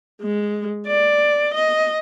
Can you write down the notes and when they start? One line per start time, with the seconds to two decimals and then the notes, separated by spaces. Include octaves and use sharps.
0.22 G#3
0.86 D5
1.54 D#5